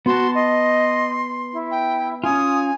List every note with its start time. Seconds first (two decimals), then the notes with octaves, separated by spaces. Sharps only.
0.06 B3 F#4 A5 C6
0.35 D#5 C6
1.53 E4
1.71 G5
2.24 C#4 F4 G#5 D#6